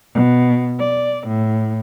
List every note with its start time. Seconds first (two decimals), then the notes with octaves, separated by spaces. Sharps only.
0.14 B2
0.78 D5
1.27 A2